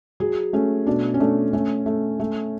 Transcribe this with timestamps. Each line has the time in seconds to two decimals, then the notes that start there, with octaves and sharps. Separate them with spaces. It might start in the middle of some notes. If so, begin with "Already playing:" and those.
0.20 F#3 G#4
0.53 A3 C#4
0.87 B2 D4
1.14 C#4
1.20 A3 D4
1.53 A3 C#4
1.86 A3
2.20 A3